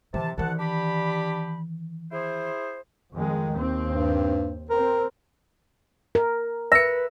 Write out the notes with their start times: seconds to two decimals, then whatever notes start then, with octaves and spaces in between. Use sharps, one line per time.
0.14 C3 D#3 E3 A5
0.38 C2 D#3 E3 F#5 A5
0.59 D4 G4 B5
2.12 E4 G#4 C5
3.13 F2 D#3 G#3
3.53 D#2 C4
3.88 G2
4.70 C4 A#4
6.15 A#4
6.72 B4 E5 E6 C#7